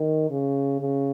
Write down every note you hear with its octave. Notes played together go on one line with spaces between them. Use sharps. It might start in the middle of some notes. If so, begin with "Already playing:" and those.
Already playing: D#3
C#3
C#3